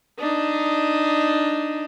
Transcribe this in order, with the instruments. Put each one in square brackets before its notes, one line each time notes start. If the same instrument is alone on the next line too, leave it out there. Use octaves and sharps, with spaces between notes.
[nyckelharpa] D4 D#4